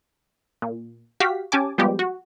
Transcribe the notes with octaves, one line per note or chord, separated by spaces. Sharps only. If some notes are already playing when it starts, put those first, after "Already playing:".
A#2
F#4 G4 F5 B6
C#4 G4 G#5 A5 D6
F3 G3 G#3 B3 G4
F#4